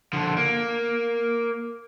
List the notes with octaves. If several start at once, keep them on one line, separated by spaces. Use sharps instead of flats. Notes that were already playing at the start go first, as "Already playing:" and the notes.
D3 F3
A#3